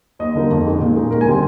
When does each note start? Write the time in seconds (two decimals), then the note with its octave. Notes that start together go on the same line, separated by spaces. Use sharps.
0.19 D#2 D#5
0.35 D3 G3 A#3 D#4
0.50 F2
0.65 D#3 G#3
0.81 A#2
0.96 G#3 D#4
1.11 D#2 A#4
1.21 G#5
1.26 D3 G3 C4 G5